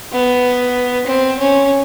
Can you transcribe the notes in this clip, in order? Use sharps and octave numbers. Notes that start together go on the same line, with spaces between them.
B3
C4
C#4